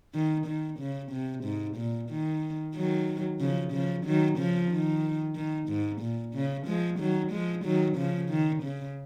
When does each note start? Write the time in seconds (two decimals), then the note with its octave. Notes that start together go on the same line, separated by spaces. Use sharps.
0.15 D#3
0.47 D#3
0.79 C#3
1.12 C3
1.44 G#2
1.78 A#2
2.10 D#3
2.75 D#3 F#3
3.40 C#3 F3
3.73 C#3 F3
4.06 D#3 F#3
4.38 C#3 F3
4.71 D#3
5.36 D#3
5.69 G#2
6.02 A#2
6.34 C#3
6.67 F3 G#3
6.99 D#3 F#3
7.32 F3 G#3
7.65 D#3 F#3
7.97 C#3 F3
8.30 D#3
8.63 C#3